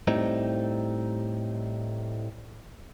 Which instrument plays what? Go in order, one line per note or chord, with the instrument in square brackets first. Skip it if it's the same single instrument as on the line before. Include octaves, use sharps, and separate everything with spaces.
[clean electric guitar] A2 G3 C4 D#4